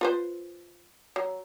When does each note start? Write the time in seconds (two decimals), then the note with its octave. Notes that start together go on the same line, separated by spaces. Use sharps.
0.01 F4 B4 C5
1.16 F#3